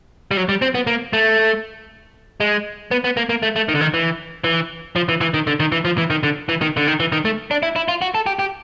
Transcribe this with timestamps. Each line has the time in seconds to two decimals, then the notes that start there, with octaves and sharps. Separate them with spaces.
0.31 G3
0.37 F#3
0.49 G3
0.62 C4
0.75 B3
0.87 A#3
1.13 A3
2.40 G#3
2.91 B3
3.04 B3
3.17 A#3
3.29 A#3
3.43 A3
3.56 A3
3.69 D#3
3.75 D3
3.81 D#3
3.94 E3
4.44 E3
4.96 F3
5.09 E3
5.21 E3
5.34 D#3
5.47 D3
5.60 D#3
5.72 E3
5.85 F3
5.98 E3
6.10 D#3
6.23 D3
6.49 E3
6.61 D#3
6.77 D3
6.87 D#3
7.00 E3
7.12 D#3
7.25 A3
7.51 D4
7.63 E4
7.76 E4
7.88 F4
8.02 F#4
8.15 A4
8.26 G4
8.39 G4